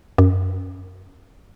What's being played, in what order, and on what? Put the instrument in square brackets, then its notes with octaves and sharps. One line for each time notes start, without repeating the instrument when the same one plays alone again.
[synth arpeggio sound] F#2